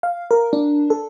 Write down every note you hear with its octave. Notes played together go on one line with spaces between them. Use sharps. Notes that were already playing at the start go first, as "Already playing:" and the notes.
F5
A#4
D4
A4